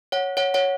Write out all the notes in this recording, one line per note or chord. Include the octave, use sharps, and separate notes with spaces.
C#5 F#5
C#5 F#5
C#5 F#5